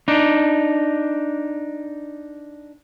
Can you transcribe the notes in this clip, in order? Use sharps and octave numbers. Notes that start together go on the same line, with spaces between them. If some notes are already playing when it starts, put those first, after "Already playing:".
D4 D#4